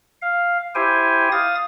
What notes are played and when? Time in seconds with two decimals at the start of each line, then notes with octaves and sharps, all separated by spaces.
0.22 F5
0.75 E4 G4 C5 G5 G#5
1.32 F5 D#6 A6